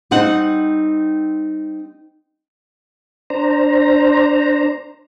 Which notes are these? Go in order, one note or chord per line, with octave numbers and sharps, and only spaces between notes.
G3 C4 D#4 F#5
D4 C5 A#5